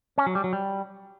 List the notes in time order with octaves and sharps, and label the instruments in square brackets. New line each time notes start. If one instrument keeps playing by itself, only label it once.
[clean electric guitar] C#4
F#3
G3
F#3
G3